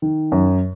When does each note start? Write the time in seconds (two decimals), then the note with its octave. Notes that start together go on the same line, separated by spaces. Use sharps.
0.02 D#3
0.32 F#2